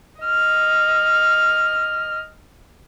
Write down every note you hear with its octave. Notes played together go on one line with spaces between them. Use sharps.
D#5 F6